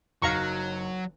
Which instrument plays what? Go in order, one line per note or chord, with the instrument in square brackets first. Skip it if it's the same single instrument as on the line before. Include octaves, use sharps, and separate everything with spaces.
[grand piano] F#1 D#4 [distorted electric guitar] F#3 [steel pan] F5 A#5 C#6